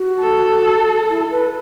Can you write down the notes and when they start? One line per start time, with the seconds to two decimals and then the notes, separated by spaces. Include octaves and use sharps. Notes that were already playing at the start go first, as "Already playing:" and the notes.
Already playing: F#4
0.20 A4
1.09 E4
1.30 B4